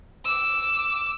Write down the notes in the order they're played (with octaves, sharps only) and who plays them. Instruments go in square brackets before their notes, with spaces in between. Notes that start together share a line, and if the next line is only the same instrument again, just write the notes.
[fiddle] D6 E6